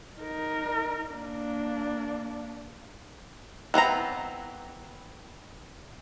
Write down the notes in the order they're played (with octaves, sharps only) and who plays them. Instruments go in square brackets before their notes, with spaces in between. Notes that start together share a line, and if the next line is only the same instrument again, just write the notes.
[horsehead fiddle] D#4 A#4
A#3 D4
[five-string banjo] E3 B3 C4 A#5